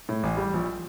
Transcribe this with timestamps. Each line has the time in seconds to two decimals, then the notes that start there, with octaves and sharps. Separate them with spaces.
0.09 A2
0.23 A1
0.37 G3
0.53 A#1